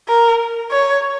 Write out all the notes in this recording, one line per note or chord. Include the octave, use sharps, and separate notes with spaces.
A#4
C#5